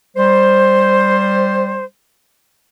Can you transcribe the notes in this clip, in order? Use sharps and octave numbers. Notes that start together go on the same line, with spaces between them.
G3 C5